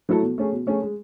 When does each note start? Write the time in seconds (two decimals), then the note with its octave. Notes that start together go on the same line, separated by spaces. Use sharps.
0.09 F#3 A3 E4 A4
0.23 B2
0.38 A3 C#4 G#4
0.52 B2
0.67 A3 C#4 G#4
0.82 G#3